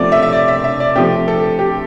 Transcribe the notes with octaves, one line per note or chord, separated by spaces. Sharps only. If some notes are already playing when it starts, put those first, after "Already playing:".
Already playing: C3 F3 A3 C4 D5
E5
E5
D5
E5
E5
D5
C3 F3 A3 C4 G4
A4
G4